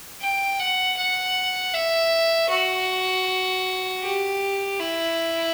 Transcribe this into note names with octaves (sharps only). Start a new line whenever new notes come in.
G5
F#5
F#5
E5
F#4
G4
E4